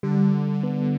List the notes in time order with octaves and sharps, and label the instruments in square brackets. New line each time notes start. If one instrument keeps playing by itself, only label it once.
[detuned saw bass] D3 [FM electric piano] G3
[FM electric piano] B3